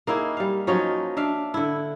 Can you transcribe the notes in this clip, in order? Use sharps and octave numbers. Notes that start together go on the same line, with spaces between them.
A#3 D#4 E4 G#4
G3 F5
F3 F#3 C#4 D#4
D4 E5 F5
D3 E4